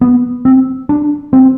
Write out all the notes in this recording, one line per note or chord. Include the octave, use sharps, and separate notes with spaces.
B3
C4
D4
C4